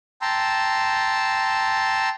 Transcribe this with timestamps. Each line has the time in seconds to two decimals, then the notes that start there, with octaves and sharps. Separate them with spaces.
0.22 G5 A5 A#5 C6 E6